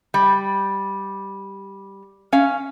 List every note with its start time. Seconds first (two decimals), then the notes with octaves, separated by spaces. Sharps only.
0.14 G3
2.32 C#4 F5